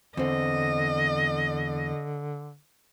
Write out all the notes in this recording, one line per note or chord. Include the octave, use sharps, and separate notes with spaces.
E2 D3 C4 D#5